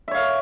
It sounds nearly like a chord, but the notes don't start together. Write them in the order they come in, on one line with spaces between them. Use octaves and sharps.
E5 C#5 F5